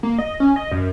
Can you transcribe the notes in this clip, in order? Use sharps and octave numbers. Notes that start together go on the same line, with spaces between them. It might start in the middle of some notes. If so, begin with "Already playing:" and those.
A#3
D#5
C#4
D#5
F#2